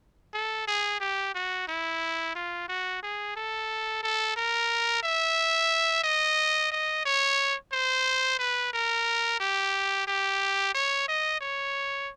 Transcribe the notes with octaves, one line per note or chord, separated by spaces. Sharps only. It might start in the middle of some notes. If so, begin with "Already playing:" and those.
A4
G#4
G4
F#4
E4
F4
F#4
G#4
A4
A4
A#4
E5
D#5
D#5
C#5
C5
B4
A#4
G4
G4
C#5
D#5
C#5